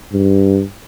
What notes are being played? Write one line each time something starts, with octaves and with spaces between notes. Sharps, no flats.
G2